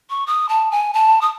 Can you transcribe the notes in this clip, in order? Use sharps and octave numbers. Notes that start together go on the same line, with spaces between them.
C#6
D#6
A5
G#5
A5
D#6